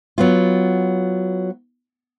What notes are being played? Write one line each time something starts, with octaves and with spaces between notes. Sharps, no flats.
F#3 B3 F4